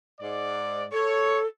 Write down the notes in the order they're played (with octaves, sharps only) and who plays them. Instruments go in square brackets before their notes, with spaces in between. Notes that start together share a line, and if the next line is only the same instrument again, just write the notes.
[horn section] G#2 D5
[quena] A4 [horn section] C#5